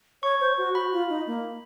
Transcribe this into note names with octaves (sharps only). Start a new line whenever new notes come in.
C#5 C#6
C5
F#4
F#4 B5
F4
D#4
A#3